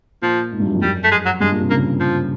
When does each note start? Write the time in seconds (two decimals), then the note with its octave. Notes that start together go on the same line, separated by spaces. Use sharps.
0.22 A#2 F3
0.52 G#2
0.60 G2
0.66 F#2
0.75 F2
0.82 F#2 G3
1.04 A3
1.11 G#3
1.26 F#3
1.40 G2 G#3
1.51 A#2
1.60 C3
1.70 C#3 A#3
2.00 F3